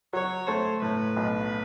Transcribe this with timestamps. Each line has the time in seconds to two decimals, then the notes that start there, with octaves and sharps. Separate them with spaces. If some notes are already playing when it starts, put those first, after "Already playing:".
0.13 F#3 C#5
0.47 A3 C5
0.82 A2 B4
1.16 B1